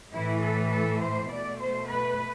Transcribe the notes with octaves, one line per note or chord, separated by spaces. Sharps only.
A2 E3 A3 E4
A4
A4
C5
B2 A3 D5
C5
B4